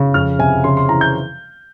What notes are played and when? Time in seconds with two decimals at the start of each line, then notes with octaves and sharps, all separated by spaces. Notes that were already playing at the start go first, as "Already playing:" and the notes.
Already playing: C#3
0.14 F2 F6
0.39 C3 G#5
0.64 C#3 C6
0.77 C6
0.89 E3 A#5
1.01 G6